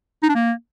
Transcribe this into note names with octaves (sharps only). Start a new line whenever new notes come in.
D#4
D4
A#3